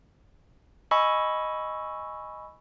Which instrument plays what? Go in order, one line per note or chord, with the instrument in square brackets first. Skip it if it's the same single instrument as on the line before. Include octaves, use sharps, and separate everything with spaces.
[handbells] D#5 G#5 B5 C#6 E6